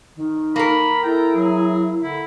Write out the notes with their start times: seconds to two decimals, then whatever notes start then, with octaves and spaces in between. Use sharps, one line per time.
0.16 D#3
0.56 A#3 A#4 B5
1.03 E4 A4 G5 A#5
1.36 F#3 G#4
2.03 D3 E4